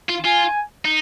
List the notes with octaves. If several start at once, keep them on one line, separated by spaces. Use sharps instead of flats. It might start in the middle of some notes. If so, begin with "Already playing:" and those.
F4
F4 G#5
D#4